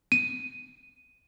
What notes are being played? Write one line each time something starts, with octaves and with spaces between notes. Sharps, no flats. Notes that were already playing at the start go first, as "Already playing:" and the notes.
D#7